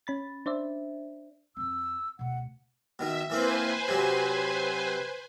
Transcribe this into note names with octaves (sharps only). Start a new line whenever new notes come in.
C#4 B5 A6
D4 C5 D5 E5
F2 C4 E6
D2 B2 F#5
B2 D#3 E5
E3 A#3 C4 B4 C5 G#5
C3 F#3